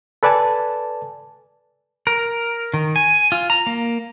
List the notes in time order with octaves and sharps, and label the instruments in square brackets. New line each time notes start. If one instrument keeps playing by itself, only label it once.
[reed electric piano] A4 B4 D5 G#5 A5
[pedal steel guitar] A#4
D#3
G#5
F4
A#5
A#3